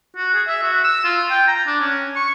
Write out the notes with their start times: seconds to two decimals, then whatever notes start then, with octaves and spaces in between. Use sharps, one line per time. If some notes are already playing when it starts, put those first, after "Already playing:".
0.16 F#4
0.34 G#4
0.47 E5
0.63 F#4
0.84 E6
1.04 F4
1.30 G5
1.47 A#5
1.67 D4
1.80 C#4
2.16 C#6